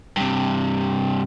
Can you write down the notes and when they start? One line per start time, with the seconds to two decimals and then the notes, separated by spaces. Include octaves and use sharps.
0.17 G2 C3